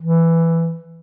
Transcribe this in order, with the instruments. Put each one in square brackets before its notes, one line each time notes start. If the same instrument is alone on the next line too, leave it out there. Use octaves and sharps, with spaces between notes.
[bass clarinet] E3